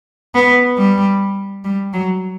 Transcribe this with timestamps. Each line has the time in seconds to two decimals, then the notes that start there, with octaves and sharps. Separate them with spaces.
0.35 B3
0.77 G3
1.64 G3
1.93 F#3